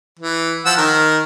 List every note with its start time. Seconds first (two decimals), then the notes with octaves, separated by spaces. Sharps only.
0.20 E3
0.66 F3 F#5 E6
0.78 D#3 A#4